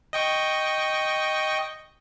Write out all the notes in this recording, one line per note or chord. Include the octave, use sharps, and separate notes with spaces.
D#5 G5 C#6